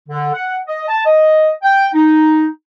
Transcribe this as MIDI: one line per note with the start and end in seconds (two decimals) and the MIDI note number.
0.09 0.32 50
0.34 0.56 78
0.67 0.82 75
0.88 1.02 81
1.06 1.50 75
1.62 1.87 79
1.93 2.46 63